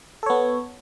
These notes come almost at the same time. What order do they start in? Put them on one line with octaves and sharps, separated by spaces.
A4 C#5 B3